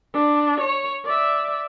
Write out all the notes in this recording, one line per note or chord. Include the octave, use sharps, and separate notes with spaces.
D4
C#5
D5 E5